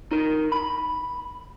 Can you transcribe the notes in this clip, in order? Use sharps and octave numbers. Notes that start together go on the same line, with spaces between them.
D#4 A#4
B5